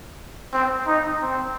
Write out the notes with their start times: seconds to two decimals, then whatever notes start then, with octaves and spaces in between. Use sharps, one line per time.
0.53 C4
0.87 D#4
1.22 C4